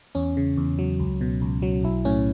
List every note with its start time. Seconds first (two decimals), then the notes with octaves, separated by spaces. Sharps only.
0.15 E2 C#4
0.37 C#3
0.57 E2
0.79 F#3
1.00 C#2
1.21 B2
1.42 C#2
1.62 F#3
1.84 B1 E4
2.05 A2 C#4